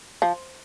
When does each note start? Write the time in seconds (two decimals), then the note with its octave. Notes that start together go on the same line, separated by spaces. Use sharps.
0.22 F3